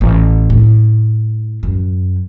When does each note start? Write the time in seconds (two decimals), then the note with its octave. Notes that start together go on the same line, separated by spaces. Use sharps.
0.01 A1
0.50 A2
1.63 F#2